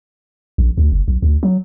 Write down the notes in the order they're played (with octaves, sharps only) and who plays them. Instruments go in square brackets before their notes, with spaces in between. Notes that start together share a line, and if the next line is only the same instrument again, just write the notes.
[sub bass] A#1
D2
F#1
B1
D2
F#3